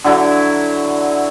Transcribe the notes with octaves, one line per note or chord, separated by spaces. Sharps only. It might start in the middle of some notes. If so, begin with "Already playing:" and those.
D3 F#3 D4 E4